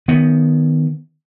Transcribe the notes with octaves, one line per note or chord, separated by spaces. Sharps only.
D#3 B3